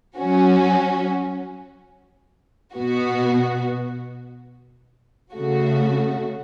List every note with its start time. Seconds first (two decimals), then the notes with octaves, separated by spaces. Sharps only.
0.17 F#3 C#4 F#4
2.74 B2 B3 F#4
5.34 C#3 A3 F#4